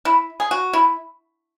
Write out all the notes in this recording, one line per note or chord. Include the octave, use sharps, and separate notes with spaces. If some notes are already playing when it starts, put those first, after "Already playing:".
E4
G#4
F#4
E4